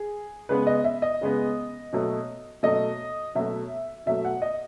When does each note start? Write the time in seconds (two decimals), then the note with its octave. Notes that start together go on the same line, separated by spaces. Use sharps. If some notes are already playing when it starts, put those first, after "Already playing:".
Already playing: G#4
0.49 C#3 G#3 B3 B4
0.67 D#5
0.84 E5
1.02 D#5
1.21 C#3 G#3 B3
1.93 B2 F#3 A3
2.63 B2 F#3 A3 D#5
3.35 B2 F#3 A3 E5
4.06 B2 F#3 A3 E5
4.25 F#5
4.42 D#5